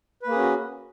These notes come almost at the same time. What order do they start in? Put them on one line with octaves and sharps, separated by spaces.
B4 A#3 G#4 C#4 F#4